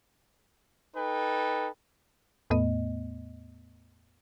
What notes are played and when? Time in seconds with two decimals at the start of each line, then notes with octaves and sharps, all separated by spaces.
0.96 D#4 A4 B4 G5
2.50 E2 A2 A3 B3 D#5